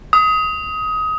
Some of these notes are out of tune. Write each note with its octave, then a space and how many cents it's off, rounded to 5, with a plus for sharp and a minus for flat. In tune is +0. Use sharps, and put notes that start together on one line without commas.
D#6 +20